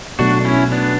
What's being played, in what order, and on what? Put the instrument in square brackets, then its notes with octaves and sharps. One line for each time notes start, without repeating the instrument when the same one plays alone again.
[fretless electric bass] B2 F#3 A3 [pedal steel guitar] D4 F#4
[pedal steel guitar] C#4 E4
B3 D4